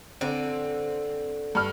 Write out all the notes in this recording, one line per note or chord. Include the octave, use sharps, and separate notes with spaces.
D3 C4
G2 F6